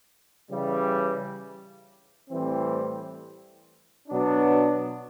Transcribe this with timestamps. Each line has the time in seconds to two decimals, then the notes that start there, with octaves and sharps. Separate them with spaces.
0.50 C#3 E3 G3
2.29 A2 E3 G3 C4
4.08 B2 F#3 B3 D4